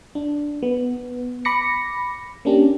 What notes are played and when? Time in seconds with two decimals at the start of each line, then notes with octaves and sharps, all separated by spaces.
0.15 D4
0.63 B3
1.45 B5 D6 A#6 C#7
2.45 A#3 C#4 D4 G4